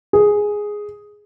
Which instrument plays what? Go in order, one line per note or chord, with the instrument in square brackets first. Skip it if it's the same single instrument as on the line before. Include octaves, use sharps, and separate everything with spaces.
[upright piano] G#4